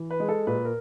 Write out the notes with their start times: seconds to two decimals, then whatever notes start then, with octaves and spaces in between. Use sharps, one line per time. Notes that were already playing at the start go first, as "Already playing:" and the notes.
Already playing: E3
0.10 B4
0.20 G#3
0.29 A4
0.47 A#2 B4
0.65 A#4